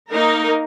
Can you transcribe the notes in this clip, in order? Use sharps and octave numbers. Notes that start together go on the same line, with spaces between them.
A#3 D#4 A#4